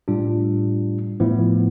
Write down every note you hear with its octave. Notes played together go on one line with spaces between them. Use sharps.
A2 G3 D4 F4
A2 F3 B3 E4